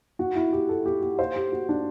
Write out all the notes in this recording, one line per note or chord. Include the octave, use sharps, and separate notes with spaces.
F#4
E4
G4
A4
G4
G4
C5
G4
F#4
D4